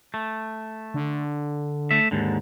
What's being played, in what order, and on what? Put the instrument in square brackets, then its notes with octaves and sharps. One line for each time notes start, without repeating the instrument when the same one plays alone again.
[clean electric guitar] A3
[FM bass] D3
[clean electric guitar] A3 E5
D#2 G#2 D3